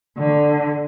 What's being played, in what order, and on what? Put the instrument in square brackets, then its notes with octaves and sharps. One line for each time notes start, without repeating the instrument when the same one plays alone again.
[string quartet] D3